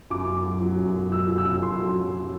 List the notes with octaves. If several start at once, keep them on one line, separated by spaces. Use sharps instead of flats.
F#2 D6
F#2
F#3
F#3
F#2
F#2
F#3 E6
F#3
E6
F#2
F#2 C6
F#3
F#3